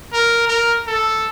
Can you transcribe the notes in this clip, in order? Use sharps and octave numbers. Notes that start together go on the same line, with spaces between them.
A#4
A#4
A4